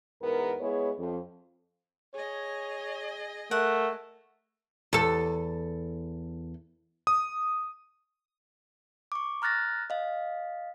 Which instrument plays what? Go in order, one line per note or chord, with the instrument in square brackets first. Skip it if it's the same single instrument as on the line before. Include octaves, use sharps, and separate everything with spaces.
[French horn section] E2 G#2 B3 A#4
G#3 B3 E4 G#4 C#5
F2
[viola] G#4 D#5 [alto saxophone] C#5
[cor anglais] A3 [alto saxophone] A#4 [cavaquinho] F#5
[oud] E2 A4
[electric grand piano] D#6
[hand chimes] C#6 D6
A#5 F6 F#6 A6 A#6
D#5 F5